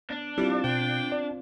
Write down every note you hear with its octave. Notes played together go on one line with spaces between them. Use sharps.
B3 D4
G3 C4 E4 F4
B2 C5 G5
D5